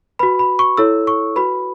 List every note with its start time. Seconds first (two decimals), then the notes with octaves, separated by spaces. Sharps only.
0.19 F#4 B4 B5
0.39 B5
0.59 C#6
0.77 E4 A4 C#5 E6
1.07 C#6
1.36 F#4 B4 B5